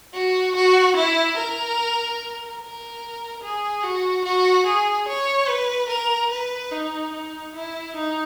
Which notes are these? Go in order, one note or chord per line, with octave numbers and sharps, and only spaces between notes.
F#4
F#4
E4
A#4
A#4
G#4
F#4
F#4
G#4
C#5
B4
A#4
B4
D#4
D#4
E4
D#4